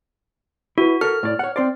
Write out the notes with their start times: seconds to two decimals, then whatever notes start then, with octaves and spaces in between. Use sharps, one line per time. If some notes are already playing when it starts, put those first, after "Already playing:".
0.78 E4 F#4 B4
1.01 A4 A#4 F6
1.23 A2 D5
1.39 C#5 F#5
1.56 C4 C5 D5